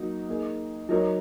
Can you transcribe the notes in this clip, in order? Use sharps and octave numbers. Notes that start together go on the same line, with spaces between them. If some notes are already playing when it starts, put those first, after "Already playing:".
Already playing: F#3 A#3 D#4 F#4
A#3 D#4 G#4
F#3 D#4 A#4 C#5